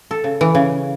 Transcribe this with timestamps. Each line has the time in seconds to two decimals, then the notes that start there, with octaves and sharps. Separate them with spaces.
0.11 A4
0.24 C#3
0.41 E3
0.55 C#3